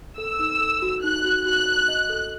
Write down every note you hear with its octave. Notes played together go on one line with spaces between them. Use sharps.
A4 E6
D#4
A4
F#4
D#4 F#6
F#4
F#4 F#6
F#4
D#5
A4